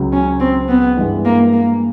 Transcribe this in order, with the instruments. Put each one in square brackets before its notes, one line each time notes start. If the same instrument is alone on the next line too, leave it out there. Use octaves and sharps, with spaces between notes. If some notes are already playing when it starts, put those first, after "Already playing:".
Already playing: [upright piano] C#2 C#3 F#3
[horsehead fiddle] C#4
C4
B3
[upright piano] G2 E3 G#3
[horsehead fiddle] A#3
A#3